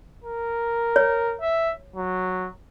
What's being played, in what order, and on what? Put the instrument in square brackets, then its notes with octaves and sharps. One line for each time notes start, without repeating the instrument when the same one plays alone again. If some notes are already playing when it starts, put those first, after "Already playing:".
[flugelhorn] A#4
[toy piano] C#5
[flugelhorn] E5
F#3